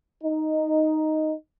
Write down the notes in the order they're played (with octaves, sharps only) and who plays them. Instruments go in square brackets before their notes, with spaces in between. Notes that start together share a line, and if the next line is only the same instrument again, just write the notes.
[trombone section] D#4